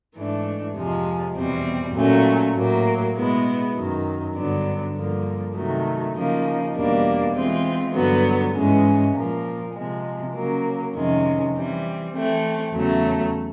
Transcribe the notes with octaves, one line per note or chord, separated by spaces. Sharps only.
G#2 E3 A3 D4
F2 C3 F3 G#3
E2 B2 G3 C4
A#2 F#3 A3 C#4
A2 F#3 A#3
B2 G#3 B3 E4
F#2 D#3 F#3
G2 D3 F#3 B3 D4
G2 D3 F3 A#3
C3 D#3 F#3 A3
C#3 F3 A#3 D#4
E2 B2 G3 A#3 D4
E3 G#3 C4 F4
G2 D3 F#3 B3
G#2 E3 G#3 C#4
A#2 F3 A#3
C3 F3 G#3
C#3 F#3 A#3
F2 C3 D#3 G#3 C#4
E3 G3 C4
E3 A3 C4
E2 C#3 F#3 A3